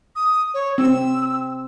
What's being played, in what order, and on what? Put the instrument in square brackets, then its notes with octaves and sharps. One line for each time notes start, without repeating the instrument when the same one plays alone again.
[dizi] D#6
C#5
[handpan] C4 [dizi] E6